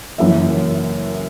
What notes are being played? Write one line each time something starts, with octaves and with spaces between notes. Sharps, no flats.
F#1 F#2 E3 E5